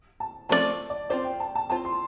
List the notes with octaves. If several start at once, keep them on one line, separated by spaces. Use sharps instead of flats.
A5
F3 A3 C4 F4 D5 A5
D5
C4 F4 C5 D5
G5
A5
A5
C4 F4 C5 A5
C6